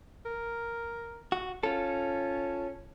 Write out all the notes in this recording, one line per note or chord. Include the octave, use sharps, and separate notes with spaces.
A#4
F#4
C#4 F4 A4